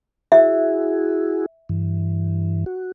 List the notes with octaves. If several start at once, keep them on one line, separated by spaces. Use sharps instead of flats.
E4 F#4 G#4 E5
G2 E3
F#4